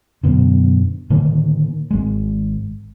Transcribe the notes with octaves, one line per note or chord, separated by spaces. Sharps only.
F#2 B2 D3
A2 D3 D#3 A#3
G#1 G#3